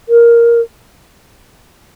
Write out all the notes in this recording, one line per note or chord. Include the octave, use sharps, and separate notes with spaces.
A#4